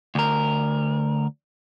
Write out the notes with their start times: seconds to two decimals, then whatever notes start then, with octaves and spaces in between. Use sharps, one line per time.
0.15 D2 A#4